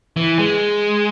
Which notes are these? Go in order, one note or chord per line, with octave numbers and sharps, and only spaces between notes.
E3
G#3